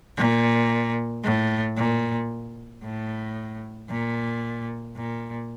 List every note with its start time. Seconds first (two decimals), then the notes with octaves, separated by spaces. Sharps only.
0.17 A#2
1.23 A2
1.77 A#2
2.83 A2
3.90 A#2
4.96 A#2